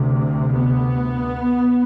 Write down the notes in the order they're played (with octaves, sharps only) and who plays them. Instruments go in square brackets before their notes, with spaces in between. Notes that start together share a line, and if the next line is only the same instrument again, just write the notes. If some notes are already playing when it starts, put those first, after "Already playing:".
Already playing: [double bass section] D2 C3
B3